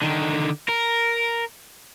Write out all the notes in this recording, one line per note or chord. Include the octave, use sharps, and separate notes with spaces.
D3 D#3
A#4